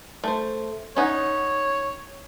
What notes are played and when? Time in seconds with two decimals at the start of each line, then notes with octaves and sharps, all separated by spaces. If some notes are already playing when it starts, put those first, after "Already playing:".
0.24 A3 C5
0.97 C#4 D#4 C#5 F#5